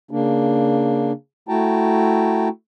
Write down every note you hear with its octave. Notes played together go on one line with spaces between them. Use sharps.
C#3 A#3 D4
A3 E4 F#4 G5 A5 A#5